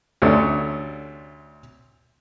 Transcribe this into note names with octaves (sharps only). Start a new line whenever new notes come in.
D2 C3 A3 C#4 D4